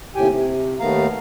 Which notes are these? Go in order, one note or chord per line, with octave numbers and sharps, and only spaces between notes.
D#2 A2 C3 G4 G5 G#5
C3
D#2 D#3 A3 B3 F5 A#5